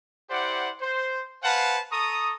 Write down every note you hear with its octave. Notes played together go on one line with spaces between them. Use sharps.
E4 G4 C5 D5 F#5
C5
B4 C5 F5 F#5 G#5 A5
A4 A#5 C#6 D#6